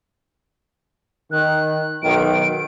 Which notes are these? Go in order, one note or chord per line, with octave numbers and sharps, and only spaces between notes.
D#3 F#6
B1 D#3 D7